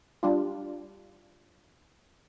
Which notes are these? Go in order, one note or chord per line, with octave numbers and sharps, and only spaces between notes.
G3 D4 F4